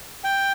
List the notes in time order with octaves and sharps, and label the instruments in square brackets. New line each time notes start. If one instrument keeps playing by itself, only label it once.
[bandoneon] G5